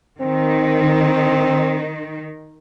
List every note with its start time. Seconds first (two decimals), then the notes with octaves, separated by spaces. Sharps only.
0.21 D#3 C4